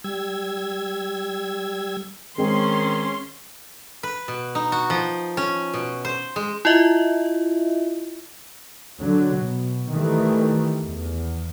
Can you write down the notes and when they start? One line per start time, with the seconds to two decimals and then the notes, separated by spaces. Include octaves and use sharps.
0.04 G3 E6 G#6
2.38 D#3 G#3 C4 C#4 C6
4.03 B4
4.28 B2
4.55 D#4
4.72 F#4
4.90 F3
5.37 C#4
5.73 B2
6.05 C5
6.36 G#3
6.65 E4 F4 D#5 E5
8.99 D3 F#3
9.37 B2
9.92 D#3 E3 G3 A3
10.83 E2